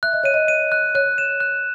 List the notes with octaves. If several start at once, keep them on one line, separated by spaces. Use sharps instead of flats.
E5 F#6
D#5
C#5 D#7
D#5
D#7
F#6
C#5 F#6
E7
F#6